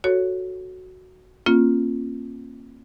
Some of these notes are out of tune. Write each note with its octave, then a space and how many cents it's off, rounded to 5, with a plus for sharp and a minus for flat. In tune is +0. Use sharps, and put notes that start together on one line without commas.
F#4 +0 A4 +0 C#5 +0
A#3 +0 C#4 -40 F4 +0